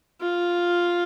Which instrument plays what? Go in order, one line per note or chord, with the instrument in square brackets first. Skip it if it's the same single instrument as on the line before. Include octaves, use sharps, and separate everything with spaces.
[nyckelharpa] F4